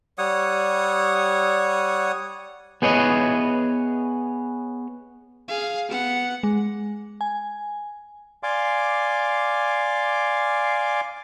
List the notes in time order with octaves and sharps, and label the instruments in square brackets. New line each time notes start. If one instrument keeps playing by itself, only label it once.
[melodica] G3 C#5 F#5 D#6
[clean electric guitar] B3 G#4 B4 C#5 D#5
[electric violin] G#4 F5
B3 F#5
[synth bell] G#3
G#5
[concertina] D5 F5 G#5 C6 D6